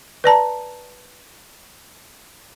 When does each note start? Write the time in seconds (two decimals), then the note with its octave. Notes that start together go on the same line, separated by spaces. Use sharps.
0.24 B4 D5 A5 A#5